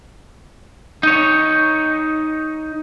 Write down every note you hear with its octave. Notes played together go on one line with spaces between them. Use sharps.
D#4 C#5